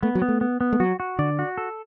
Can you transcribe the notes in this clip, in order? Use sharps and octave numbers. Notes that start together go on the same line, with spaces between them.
A3 B3
F#3
B3
A3
B3
B3
A3
F#3 F#4
F#4
D3 D5
F#4
A4